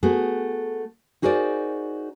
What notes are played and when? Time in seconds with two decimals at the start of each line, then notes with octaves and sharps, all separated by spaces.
0.03 A3 B3 F#4 G#4
1.22 D#4 F#4 G#4 A#4 C5 D5